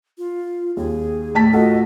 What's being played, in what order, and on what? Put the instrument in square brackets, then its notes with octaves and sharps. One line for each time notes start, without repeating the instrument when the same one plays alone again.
[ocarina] F4
[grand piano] D#2 [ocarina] G#4
[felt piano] A2 A5 B6
[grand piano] F4 F#4 A4 [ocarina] D#5